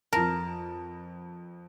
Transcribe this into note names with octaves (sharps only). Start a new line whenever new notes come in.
F2 A#4 A5